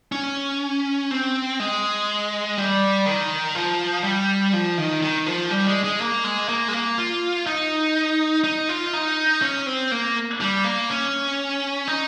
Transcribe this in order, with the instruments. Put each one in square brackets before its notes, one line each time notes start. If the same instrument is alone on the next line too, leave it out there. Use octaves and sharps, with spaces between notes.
[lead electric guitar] C#4
C4
G#3
G3
D#3
F3
G3
F3
D#3
D#3
F3
G3
G#3
G#3
A#3
G#3
A#3
G#3
A#3
F4
D#4
D#4
F4
D#4
C#4
C4
A#3
G3
A#3
C#4
D#4